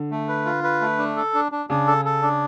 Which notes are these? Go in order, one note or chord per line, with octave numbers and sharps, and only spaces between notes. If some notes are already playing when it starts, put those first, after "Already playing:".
Already playing: D3
A3
B4
F4
B4
A3
D4
A4
D4
D4
C#3 D4
A4
A4
D4